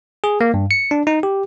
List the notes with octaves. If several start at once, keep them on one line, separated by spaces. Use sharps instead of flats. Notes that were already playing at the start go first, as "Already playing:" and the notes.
G#4
A#3
G2
C#7
D4
D#4
G4